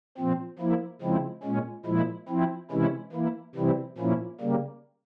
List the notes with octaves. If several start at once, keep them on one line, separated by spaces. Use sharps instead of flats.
A#2 F3 C4
F3 A#3 E4
C#3 F3 G#3 C4 E4
A#2 G#3 C#4
A#2 F3 G#3 E4
F3 C4 E4
C3 E3 G#3 C#4 E4
E3 A#3 E4
C3 E3 G3 C4 E4
A#2 F3 A#3 C#4 E4
C#3 G3 A#3